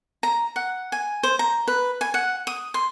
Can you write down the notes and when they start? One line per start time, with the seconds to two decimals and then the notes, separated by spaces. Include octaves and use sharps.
0.23 A#5
0.56 F#5
0.92 G#5
1.23 C5
1.39 A#5
1.68 B4
2.01 G#5
2.14 F#5
2.47 D#6
2.74 C6